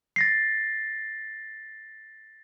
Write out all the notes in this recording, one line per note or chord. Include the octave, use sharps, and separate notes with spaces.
A6 A#6 C7